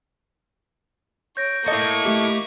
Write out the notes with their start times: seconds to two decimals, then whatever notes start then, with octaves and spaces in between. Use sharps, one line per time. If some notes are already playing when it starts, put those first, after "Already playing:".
1.37 C#5 G6 A#6 D7
1.68 A#3 E4 A4 D#5 C#6
2.05 A3 G4